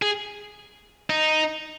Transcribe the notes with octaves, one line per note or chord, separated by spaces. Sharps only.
G#4
D#4